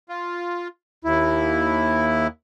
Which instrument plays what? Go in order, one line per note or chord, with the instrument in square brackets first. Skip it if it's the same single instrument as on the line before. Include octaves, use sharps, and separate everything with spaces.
[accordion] F4
D#2 E4